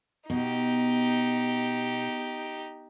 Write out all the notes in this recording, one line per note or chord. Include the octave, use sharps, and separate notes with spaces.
B2 D#4 G4